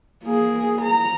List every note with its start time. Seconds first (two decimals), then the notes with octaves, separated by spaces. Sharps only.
0.24 A#3 G#4
0.82 A#5